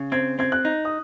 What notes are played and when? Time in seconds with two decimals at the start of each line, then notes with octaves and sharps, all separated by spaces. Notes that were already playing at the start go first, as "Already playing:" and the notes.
Already playing: C#3
0.12 C4 G#6
0.39 C4 G#6
0.52 F#6
0.65 D#4
0.85 D#6